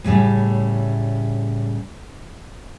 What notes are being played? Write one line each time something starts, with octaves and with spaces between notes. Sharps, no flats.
A2 C#3 G3 A3